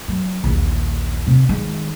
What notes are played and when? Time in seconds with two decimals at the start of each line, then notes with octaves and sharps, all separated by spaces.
0.08 F#3
0.44 A#1 D#2
1.27 C3
1.49 D#3 G#3